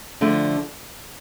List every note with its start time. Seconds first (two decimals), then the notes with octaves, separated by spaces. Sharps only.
0.21 D3 F3 A3 D4